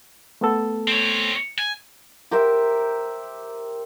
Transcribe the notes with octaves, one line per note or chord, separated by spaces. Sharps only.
A3 B3 A4
C4 C#5
G#5
G4 A#4 C5 E5